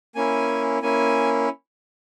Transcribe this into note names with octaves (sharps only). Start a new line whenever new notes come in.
A#3 C#4 E4 G#5
A#3 C#4 E4 G#5